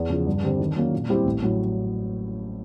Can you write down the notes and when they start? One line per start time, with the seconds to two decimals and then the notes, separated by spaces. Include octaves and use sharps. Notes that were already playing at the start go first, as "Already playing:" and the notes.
Already playing: E2
0.10 C#3 F3
0.27 G2
0.43 D3 G3 C4
0.60 D#3
0.76 F#3 A#3 C#4
0.93 A#2
1.09 G3 C4 E4 G4
1.25 A1
1.42 A2 F#3